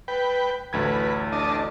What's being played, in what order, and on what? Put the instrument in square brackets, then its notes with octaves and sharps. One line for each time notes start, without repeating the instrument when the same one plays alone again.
[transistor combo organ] B4 G5
[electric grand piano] A1 D2 G#6 [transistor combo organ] B4
[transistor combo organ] D4 D#5 A5